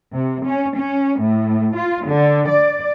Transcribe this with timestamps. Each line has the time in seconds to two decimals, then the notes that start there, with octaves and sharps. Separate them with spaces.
0.14 C3
0.46 C#4
0.77 C#4
1.22 A2
1.76 F4
2.08 D3
2.49 D5